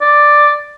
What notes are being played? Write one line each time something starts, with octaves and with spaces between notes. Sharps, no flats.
D5